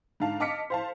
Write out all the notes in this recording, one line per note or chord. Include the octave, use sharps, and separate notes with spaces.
G#2 D3 F5 A5
D#5 A5 D6 F6 B6 C#7
C5 F5 A5